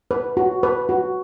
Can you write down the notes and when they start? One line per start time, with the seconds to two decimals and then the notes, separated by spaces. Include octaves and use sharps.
0.11 B4
0.37 F#4
0.63 B4
0.89 F#4